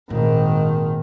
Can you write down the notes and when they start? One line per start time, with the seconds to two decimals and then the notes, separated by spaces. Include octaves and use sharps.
0.10 G#1 A#2 D#3